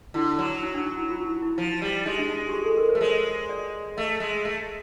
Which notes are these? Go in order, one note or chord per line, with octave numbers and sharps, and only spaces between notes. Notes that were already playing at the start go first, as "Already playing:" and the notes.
D3 E4
F#3
D#4
D4
D#4
E4
F4
E4
E4
F3 D#4
G3
G#3 D#4
D4
D#4
G4
G#4
A4
A#4
C5
A3
G#3 C#5
D5
A3 D#5
G#3
A3